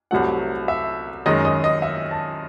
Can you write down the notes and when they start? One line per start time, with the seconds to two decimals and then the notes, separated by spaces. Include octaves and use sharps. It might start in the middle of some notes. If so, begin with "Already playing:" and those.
0.11 C2 C3 F#3 A3 F#5
0.68 E5
1.26 F#2 D#3 G#3 D#5
1.45 D#5
1.64 D#5
1.82 E5
2.11 A5